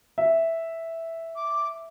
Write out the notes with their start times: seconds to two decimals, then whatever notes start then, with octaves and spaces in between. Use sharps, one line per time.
0.18 E5
1.36 D6